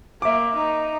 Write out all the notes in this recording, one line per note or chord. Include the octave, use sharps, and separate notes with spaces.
A#3 E5 D6
D#4